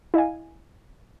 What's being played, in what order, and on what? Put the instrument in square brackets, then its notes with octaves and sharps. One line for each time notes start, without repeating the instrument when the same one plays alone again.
[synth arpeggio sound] E4 D#5 F5 G#5